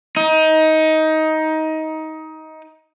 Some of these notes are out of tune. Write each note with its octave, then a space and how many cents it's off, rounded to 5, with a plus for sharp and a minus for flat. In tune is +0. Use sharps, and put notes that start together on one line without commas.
D#4 +20